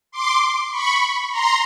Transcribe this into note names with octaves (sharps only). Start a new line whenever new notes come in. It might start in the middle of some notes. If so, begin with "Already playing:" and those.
C6 D6
B5 C#6
A#5 C6